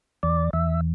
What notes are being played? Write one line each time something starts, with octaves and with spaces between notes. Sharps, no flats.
E2 D5
E2 E5